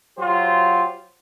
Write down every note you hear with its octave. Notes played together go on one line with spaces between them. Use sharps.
F#3 F4 G4 C5